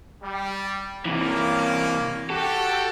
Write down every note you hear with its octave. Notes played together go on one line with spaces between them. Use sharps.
G3
C3 E3 A#3 C#4
F#4 G4 A4